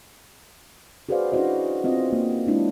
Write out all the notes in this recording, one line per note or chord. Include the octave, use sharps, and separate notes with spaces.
F#4 G#4 B4 C5 D5 F5
C#4 D4 E4 F#4 C5 D#5
B3 C4 F4 D#5
A#3
G#3 C#4 D4 E4